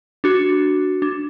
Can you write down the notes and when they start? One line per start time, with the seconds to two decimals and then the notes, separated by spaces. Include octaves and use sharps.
0.24 D4 F#4
1.02 D4